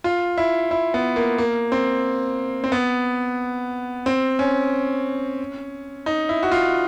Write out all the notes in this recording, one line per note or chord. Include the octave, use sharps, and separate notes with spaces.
F4
E4
E4
B3
A#3
A#3
C4
C4
B3
C4
C#4
D#4
E4
F#4
F4